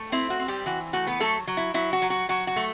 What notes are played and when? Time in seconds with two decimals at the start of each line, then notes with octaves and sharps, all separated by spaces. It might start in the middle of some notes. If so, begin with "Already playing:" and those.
Already playing: A3
0.12 C4 E4
0.30 F#4
0.39 C4
0.48 G3 G4
0.66 E3 F#4
0.93 A3 F#4
1.07 B3 B4
1.20 F#3 A3 A4
1.47 F#3
1.57 E4
1.74 F#3 E4
1.93 F#4
2.02 F#3
2.10 F#4
2.29 F#3 F#4
2.47 F#4
2.56 A3